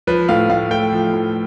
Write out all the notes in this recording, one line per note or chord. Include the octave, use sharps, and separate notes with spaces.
F3 B4
A2 F5
A2 F5
A3 G5
F3
A2